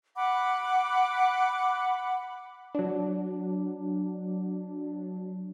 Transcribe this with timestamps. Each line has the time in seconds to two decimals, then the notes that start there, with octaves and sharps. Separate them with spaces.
0.16 F#5 B5 D6
2.74 F#3 D4